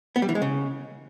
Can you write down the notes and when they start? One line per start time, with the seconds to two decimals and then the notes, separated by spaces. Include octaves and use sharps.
0.16 B3
0.22 G3
0.29 E3
0.35 G#3
0.42 C#3